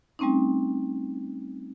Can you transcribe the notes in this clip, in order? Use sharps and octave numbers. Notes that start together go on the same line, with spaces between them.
G3 A3 C4 C#4 D#4